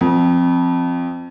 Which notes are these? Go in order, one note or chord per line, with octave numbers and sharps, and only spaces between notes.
F2